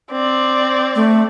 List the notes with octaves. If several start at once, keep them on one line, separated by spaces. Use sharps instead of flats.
C4 D5
A3